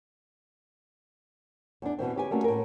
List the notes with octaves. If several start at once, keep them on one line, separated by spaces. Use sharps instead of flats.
E2 D4
B2 E3 C4
C#3 G4 G#5
G3 A3 A#3 C#4 F#4
A2 A#4